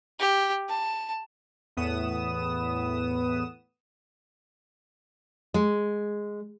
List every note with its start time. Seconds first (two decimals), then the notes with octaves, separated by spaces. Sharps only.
0.19 G4
0.69 A5
1.77 E2 A2 B3 B4 D#6 E7
5.54 G#3